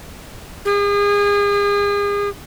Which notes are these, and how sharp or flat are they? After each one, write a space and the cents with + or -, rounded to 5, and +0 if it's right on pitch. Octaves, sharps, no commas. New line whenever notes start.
G#4 -35